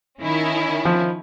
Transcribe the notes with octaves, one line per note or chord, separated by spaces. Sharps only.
D#3 C#4 E4
F3